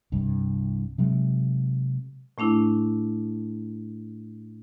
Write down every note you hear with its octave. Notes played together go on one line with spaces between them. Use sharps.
C2 G2
C3 F#3 G#3
A2 A3 D4 E4